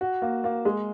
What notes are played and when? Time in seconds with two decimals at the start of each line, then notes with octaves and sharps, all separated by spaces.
0.01 F#4
0.22 A#3
0.44 A#3
0.65 G#3